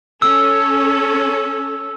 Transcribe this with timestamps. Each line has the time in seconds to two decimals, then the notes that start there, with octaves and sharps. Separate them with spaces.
0.22 C#4 A4 E6